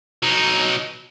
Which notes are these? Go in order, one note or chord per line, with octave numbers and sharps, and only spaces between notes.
F#3 D#4